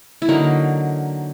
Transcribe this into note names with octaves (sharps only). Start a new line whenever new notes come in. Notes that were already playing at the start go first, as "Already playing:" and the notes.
E4
D3 F#3 A#3 D#4